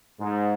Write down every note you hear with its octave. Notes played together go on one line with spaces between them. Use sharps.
G#2